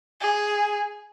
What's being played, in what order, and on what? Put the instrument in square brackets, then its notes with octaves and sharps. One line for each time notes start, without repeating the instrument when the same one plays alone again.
[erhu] G#4